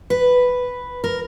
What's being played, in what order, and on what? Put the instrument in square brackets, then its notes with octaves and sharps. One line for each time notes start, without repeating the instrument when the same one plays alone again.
[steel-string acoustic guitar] B4
A#4